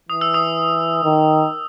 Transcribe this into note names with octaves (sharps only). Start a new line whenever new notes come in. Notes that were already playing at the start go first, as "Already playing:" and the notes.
E3 D#6
E6
D#6
D#3